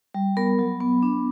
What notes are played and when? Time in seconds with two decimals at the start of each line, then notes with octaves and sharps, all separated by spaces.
0.14 G3
0.37 B3 A#4
0.59 F#3
0.81 B3
1.03 D4